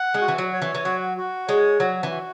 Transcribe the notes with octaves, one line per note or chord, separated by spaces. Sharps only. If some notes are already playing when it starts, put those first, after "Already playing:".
Already playing: F#5
G#3
F#4
E3
F#3
C#5
E3
E3
F#3 F#4
F#4
G#3 C#5
F#3 F#4
E3
F#4